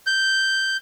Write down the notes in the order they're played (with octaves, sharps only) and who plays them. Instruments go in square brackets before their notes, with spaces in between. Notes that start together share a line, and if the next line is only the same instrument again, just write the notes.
[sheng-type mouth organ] G6